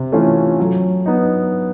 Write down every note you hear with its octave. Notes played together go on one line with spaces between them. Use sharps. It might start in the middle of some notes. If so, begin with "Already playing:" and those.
Already playing: C3
E3 A3 C#4 F4
F#3
B3 D#4